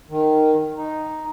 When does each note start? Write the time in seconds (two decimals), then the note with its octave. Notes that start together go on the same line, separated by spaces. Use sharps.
0.09 D#3
0.77 D#4